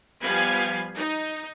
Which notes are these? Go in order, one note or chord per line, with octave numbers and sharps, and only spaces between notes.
F3 G3 B3 F5 G#5 B5
D#4